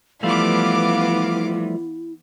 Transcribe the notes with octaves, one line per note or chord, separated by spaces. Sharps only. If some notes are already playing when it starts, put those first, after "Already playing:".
E3 F3 G3 A3 B3 E4 F5 D6